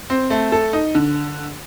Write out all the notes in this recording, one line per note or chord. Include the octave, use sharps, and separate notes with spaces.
C4
A3
A4
D#4
D3